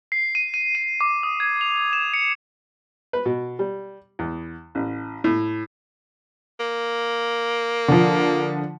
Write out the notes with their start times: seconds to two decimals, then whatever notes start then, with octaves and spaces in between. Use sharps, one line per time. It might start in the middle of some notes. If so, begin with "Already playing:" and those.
0.12 C7
0.35 D#7
0.54 D#7
0.75 D#7
1.01 D6
1.23 D#6
1.40 G#6
1.61 F7
1.93 E7
2.14 C#7
3.13 B4
3.26 B2
3.59 G3
4.19 E2
4.75 A1
5.24 A2
6.60 A#3
7.88 D3 F3